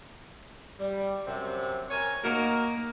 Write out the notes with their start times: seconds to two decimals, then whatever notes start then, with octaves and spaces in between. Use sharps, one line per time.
0.79 G3
1.26 F#2 C3
1.90 A#4 C#5 G#5
2.23 A#3 D#4 F#4 A#4